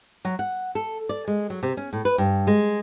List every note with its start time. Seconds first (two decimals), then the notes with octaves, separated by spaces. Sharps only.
0.25 F#3
0.39 F#5
0.75 A4
1.09 D5
1.27 G#3
1.50 F#3
1.63 C3
1.77 C#4
1.93 A2
2.05 B4
2.18 G2
2.47 G#3